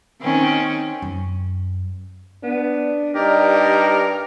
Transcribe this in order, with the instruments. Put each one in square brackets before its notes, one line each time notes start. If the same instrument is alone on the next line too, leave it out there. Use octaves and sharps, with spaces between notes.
[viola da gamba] D#3 C4 C#4
[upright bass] F#2
[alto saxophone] B3 [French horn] D4
[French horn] G2 [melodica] D#4 D5 [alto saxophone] G4 [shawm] A#4